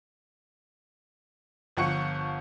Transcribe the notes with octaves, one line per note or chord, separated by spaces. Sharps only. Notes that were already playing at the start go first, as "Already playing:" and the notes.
G1 F3 F#5 C#6 C#7